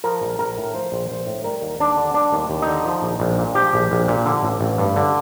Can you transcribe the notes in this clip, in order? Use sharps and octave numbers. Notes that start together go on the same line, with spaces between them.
F3 A#4
A#1
A#1 A#4
A2
F3 C5
A#1
A#1 C5
A2
G3 A#4
D#2
D#2 D4
D3
G3 D4
D#2
D#2
D3 D#4
F3
A#1
A#1
A#2
F3 G4
A#1
A#1
A#2
D3
A1
A1
G2
D3